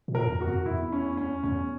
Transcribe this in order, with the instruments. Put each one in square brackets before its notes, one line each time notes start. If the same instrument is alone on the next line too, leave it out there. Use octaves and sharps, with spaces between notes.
[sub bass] A#2
[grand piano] A#4
[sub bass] E2
[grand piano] F#4
[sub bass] F2
[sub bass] E2 [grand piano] E4
[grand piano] C#4
C#4
[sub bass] E2 [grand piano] C#4